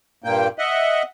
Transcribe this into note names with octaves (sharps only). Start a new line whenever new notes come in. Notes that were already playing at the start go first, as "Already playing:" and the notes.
G2 A#2 A#3 G5
D#5 E5 F#5